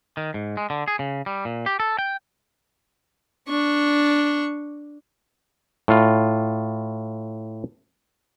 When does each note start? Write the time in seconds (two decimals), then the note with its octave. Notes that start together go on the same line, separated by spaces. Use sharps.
0.17 D#3
0.34 G#2
0.57 G#3
0.70 D3
0.88 G#4
0.99 C#3
1.26 G3
1.45 A#2
1.66 G4
1.80 A4
1.99 G5
3.49 D4 C#6
5.88 A2 F4